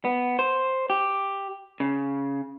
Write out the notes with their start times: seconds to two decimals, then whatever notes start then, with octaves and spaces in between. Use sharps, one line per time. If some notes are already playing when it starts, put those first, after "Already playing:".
0.05 B3
0.39 C5
0.90 G4
1.80 C#3